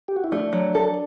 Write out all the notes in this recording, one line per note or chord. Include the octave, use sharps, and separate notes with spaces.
G4
F#4
E4
A3 D4
F#3
A4